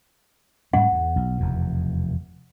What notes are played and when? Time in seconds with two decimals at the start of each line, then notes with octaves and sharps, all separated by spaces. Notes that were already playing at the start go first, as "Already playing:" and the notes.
0.73 G#2 G3 C#4 F#5
0.92 E2
1.16 B1
1.38 F1 E2 B2